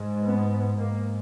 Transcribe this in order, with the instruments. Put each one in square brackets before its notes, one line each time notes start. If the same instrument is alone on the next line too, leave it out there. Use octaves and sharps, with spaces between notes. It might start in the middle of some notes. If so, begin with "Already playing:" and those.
Already playing: [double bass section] G#2
B3
G#2 A#3